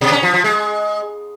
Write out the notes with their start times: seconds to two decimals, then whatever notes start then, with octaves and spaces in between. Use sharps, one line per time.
0.01 B2
0.12 C#4
0.23 F3
0.34 F3
0.44 G#3